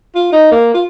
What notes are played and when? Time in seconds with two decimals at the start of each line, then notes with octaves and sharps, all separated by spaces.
0.15 F4
0.32 D#4
0.52 A#3
0.74 F4